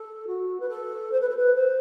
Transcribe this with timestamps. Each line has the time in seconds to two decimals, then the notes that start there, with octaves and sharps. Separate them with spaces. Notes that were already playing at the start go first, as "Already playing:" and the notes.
Already playing: A4
0.27 F#4
0.60 B4
0.68 A4
1.11 C5
1.21 B4
1.28 A4
1.36 B4
1.54 C5